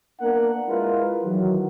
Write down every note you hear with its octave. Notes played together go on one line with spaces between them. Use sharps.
A#3 B3 D4 A#4 F#5
G#3 E4 F4 A#4 B4
D#3 E3 F#3